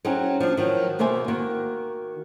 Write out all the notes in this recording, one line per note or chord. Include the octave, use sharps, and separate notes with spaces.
F#3 C4 C#4 D#4 F#4 G#4
F3 D4
D#3 F3 F#3
B2 D#3 A#3 C5 E5 G#5
D#3 A#3 F#4